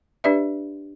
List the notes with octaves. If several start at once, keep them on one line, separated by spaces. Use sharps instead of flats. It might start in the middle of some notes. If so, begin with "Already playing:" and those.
D4 G4 B4 D5 E5